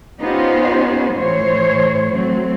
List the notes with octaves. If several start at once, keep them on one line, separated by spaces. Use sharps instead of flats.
B3 C#4 D#4 F4 G4 C5
A2 E3 C5 C#5
F#3 A3 C4